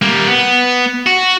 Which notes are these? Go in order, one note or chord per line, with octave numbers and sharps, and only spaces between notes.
G3 A#3
B3
F#4